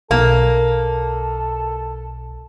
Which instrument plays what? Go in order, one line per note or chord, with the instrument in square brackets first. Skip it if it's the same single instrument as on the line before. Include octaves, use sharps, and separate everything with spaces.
[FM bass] B1 [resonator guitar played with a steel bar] A#3 [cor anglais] A4